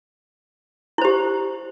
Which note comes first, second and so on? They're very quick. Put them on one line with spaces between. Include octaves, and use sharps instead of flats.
E4 C5 G4